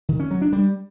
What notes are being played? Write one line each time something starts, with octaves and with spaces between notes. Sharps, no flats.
D#3
C#4
F#3
D4
G3